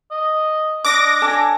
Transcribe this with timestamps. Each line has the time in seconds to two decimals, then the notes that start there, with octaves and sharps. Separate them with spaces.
0.11 D#5
0.85 D4 D#5 D6 A#6
1.22 A4 C#5 G#5